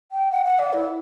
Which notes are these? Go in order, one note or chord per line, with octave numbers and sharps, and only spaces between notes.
G5
F#5
F#5
D5
E4